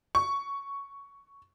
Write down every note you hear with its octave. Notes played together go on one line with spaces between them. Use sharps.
C#6